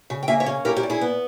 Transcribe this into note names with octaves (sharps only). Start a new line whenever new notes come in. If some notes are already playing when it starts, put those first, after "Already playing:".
C#3
G5
A#3 E5 G#5
C#5 E5
C#4
E4 G4 A#4
G4 A#4
A#2
E4 G#4
B3